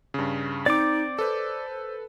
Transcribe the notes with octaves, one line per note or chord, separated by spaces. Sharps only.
G2 C#3
C4 D#4 D5 D6
A4 B4 C5